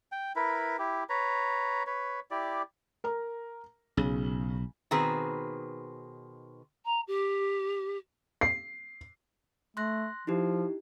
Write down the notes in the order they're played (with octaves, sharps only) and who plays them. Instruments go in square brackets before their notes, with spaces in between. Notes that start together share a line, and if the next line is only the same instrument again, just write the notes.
[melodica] G5
E4 A#4 B4
E4 G4
B4 C#5 A#5
B4 C#5
E4 G4 D5
[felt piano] A#4 A#5
[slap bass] B1 [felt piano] C#3
[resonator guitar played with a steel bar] B2 D#3 C4 G#4 B4
[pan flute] A#5
G4
[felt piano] C7
[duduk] A3 [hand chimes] C6 F#6 A#6
[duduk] F3 [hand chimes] D#4 E4 G4